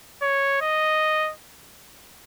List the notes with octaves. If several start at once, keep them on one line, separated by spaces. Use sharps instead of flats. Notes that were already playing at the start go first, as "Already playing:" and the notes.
C#5
D#5